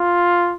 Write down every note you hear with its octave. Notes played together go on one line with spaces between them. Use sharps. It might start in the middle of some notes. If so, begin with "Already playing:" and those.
Already playing: F4